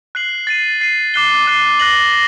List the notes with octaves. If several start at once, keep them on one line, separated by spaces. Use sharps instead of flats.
F#6 C7 F#7
A6 C7 D#7
A6 C7 D#7
D6 F#6 C7 G7
D6 F#6 C7 G7
F#6 A#6 F#7
A#6